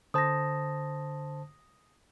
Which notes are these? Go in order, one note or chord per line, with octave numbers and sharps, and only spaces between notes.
D3 C5 A5 D#6 A#6